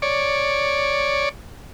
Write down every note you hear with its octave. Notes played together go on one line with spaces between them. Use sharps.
C#5 D5